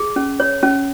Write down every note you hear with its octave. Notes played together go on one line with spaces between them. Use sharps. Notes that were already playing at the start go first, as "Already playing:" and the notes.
Already playing: G#4
C#4
C#5
C#4